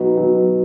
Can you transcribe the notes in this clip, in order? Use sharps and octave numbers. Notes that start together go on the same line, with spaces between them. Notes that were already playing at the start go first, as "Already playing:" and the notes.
Already playing: B2 F#3 B3 D#4 F#4
B2 F#3 B3